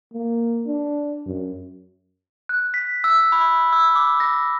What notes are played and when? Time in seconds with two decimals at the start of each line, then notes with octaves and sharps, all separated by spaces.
0.13 A#3
0.67 D4
1.27 F#2
2.49 F#6
2.74 B6
3.04 E6
3.32 B5
3.73 E6
3.96 D6
4.20 A#6